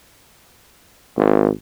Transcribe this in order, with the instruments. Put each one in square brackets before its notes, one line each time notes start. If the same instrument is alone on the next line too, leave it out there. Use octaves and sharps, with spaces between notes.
[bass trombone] G#1